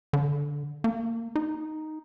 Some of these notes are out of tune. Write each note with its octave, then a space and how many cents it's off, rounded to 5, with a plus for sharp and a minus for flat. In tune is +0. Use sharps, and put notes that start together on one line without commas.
D3 -10
A#3 -20
D#4 +0